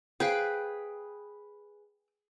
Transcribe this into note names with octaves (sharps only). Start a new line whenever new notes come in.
G#4 B4 C5 F5 G5